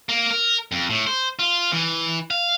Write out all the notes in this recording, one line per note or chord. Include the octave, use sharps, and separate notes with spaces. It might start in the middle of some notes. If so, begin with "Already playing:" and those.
A#3
A#4
F2
A2
C5
F4
E3
F5